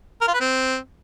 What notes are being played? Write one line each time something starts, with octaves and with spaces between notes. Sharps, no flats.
A#4
F4
B4
C4